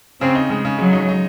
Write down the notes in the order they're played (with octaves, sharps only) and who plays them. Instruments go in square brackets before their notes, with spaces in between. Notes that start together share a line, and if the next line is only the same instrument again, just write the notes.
[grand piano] C#3 [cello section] C4
[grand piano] D#4
[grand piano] C#3 [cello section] G#3
[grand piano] C#3
[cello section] F#3 [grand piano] G#3
[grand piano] D#4
D#4